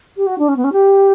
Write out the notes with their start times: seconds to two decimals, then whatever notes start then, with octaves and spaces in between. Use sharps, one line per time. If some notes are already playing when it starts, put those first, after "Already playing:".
0.17 G4
0.26 F#4
0.38 D4
0.48 C#4
0.56 B3
0.64 C#4
0.72 G4